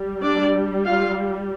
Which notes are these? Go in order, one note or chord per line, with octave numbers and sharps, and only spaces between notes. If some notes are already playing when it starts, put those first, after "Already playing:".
Already playing: G3
D4 D5
F4 F5